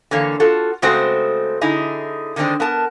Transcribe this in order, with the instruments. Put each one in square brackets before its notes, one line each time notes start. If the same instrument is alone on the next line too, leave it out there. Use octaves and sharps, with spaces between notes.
[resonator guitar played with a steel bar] D3 E3 A#3 C#5
F4 F#4 A4
C#3 G#3 A3 C4 F#4 C5
D3 D#4 E4 G#4
D3 D#3 G#3 B3 C4 D4
B3 A#4 A5